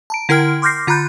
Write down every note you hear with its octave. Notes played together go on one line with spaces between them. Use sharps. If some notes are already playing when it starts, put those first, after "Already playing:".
A5 A#5 D7
D3 E4 A#4 G5 F6
C6 D6 F6 G6 A#6 C7
D3 F4 A#5 B5 F#6 G6